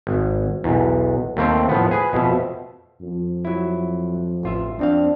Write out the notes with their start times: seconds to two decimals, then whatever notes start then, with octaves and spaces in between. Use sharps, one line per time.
0.07 G#1
0.64 B1 E2
1.37 D#2 A3 A#3 C4
1.69 A2 F3 B3
1.91 G#4 B4
2.13 F2 B2 E5
3.02 F2
3.45 F#3 E4
4.43 A1 F4 E5
4.79 F2 C4 D4 F5